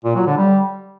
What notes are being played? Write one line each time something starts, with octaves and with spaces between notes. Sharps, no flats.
A#2
F#3
D3
G3